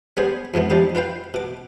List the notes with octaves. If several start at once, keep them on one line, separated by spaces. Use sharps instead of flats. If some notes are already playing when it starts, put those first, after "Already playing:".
G3 B3 G#4 C5
F2 G#2 E3 B3
F3 G3 D#4 G4
F4 B4 F5 G5
B2 D6